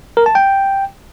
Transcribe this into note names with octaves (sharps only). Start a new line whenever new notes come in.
A#4
A5
G5